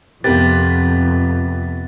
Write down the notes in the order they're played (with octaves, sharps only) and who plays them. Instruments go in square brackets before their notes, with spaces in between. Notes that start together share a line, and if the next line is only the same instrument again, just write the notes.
[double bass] F2 [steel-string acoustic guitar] C3 B3 F4 [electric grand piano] G4 A#4 B4 [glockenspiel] A6